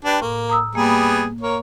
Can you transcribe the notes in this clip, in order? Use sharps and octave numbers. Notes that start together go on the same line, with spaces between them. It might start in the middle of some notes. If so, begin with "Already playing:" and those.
D4 G4 B4
A2 A#3
A#5 D#6 E6
G3 A#3 B3 G#4
A#3 C#5